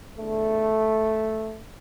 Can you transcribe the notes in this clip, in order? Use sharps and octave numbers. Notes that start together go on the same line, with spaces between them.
E2 D3 A3